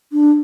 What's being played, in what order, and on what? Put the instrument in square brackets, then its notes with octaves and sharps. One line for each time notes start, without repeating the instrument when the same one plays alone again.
[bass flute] D4